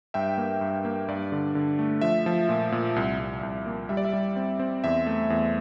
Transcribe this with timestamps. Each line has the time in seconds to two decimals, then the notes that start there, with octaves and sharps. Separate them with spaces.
0.14 G2 E5 G5
0.38 A#3
0.61 G2
0.85 A#3
1.08 G2 D5
1.32 D3
1.55 D3
1.79 A3
2.01 F3 E5
2.26 F3
2.49 A#2
2.72 A#2
2.96 C2
3.19 C2
3.43 C2
3.66 A#3
3.89 G3 E5
3.97 D5
4.05 E5
4.13 G3
4.36 C4
4.60 C4
4.84 E2 E5
5.07 A3
5.30 E2